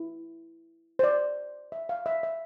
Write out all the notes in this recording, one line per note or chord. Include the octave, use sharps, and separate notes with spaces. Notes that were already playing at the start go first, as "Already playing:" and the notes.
Already playing: E4
C5
D5
E5
F5
E5
E5